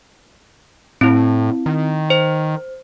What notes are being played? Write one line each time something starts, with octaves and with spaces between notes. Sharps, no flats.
A2 C4 E4
D#3
C5